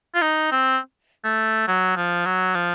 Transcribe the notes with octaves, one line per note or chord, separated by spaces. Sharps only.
F4
D#4
C4
A3
F#3
F3
F#3
F3